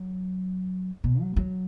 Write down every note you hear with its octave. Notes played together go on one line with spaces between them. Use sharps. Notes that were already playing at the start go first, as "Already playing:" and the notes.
Already playing: F#3
B2
F#3
F#3